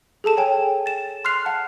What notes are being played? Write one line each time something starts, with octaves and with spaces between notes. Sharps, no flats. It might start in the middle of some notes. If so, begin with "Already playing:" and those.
G#4 A4 A5 E7
C#5 G5 G#5
A6 E7
C6 F6 F#6 C7 F7
F#5 A5